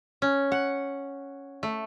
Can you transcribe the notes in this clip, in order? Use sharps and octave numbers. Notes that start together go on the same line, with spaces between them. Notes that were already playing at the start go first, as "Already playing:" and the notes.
C#4
F#5
A3